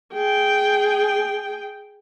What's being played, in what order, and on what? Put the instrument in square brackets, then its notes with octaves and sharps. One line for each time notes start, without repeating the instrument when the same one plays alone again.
[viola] G#4 G5